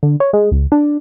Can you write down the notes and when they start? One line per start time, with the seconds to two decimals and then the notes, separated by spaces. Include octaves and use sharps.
0.03 D3
0.20 C#5
0.33 G#3
0.52 C#2
0.72 D4